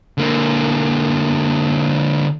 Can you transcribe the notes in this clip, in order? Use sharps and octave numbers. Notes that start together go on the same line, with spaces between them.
D3 A#3